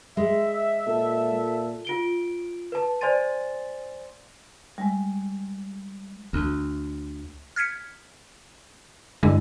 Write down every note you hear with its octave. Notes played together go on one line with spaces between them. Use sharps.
G#3 E5
A#2 A4
F4 D7 G7
B4 A5
C5 D5 G#5 C6 A6 D#7
G3 G#3
D2
F6 G#6 B6 C#7
G2 D3 G#3 E4